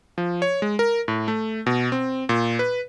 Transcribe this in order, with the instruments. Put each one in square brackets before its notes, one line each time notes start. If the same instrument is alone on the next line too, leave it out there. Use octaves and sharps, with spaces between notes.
[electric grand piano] F3
C#5
G#3
A#4
A2
A3
B2
C4
A#2
B4